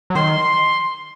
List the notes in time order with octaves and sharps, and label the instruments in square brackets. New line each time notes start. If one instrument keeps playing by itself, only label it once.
[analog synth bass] F#3
[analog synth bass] D#3 [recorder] C6